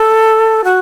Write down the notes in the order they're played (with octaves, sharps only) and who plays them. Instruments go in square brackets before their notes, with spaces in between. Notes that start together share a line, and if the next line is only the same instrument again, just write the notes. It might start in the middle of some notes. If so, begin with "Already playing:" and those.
Already playing: [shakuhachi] A4
F#4